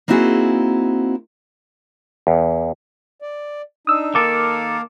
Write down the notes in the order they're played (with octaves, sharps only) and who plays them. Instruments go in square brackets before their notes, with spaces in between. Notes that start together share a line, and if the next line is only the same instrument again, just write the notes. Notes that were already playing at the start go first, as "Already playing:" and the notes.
[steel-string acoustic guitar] A#3 C4 D#4 E4 F#4 G#4
[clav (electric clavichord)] E2
[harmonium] D5
[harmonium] D4 D#4 [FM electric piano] D#6 E6
[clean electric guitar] D#3 A4 [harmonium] A#3 A#4 F5 [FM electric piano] D6